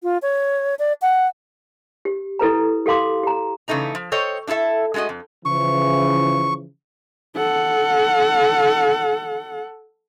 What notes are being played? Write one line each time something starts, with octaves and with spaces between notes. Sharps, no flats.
F4
C#5
D5
F#5
G4
E4 A4 B4 A#5
G4 A4 F5 C6 D6
G4 A#5
C#3 E3 A3 D#4 A#5
F3
A4 C5 C#5 D#5 G5
D4 E4 F4 A4 E5
G#3 A3 F4 F#4 D#5
F2
C#3 E3 F3 C#6
A4 F#5